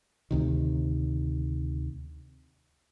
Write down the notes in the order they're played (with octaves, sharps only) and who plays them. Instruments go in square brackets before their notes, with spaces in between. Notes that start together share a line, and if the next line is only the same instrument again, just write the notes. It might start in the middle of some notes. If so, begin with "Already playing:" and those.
[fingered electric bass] D2 C3 D#3